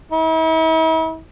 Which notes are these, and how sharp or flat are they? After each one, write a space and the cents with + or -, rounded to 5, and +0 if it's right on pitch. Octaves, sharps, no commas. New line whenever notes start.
E4 -45